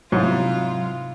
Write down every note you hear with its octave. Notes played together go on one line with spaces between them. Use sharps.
G#2 C3 F#3 E4 F4 D#5